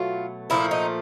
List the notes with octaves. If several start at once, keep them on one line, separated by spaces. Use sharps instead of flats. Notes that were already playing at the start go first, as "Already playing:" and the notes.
Already playing: B2 F#3 A3 F4
A#2 F3 A3 E4
D#4